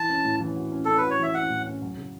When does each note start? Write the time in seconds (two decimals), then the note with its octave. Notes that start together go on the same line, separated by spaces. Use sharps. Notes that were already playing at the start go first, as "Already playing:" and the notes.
Already playing: E3 A5
0.09 C#4
0.25 A2
0.40 E3
0.56 F#4
0.72 C#4
0.85 C#4 A4
0.97 B4
1.03 F#4
1.10 C#5
1.19 E3 E5
1.34 C#4 F#5
1.50 A2
1.66 C#4
1.82 F#3
1.97 C#3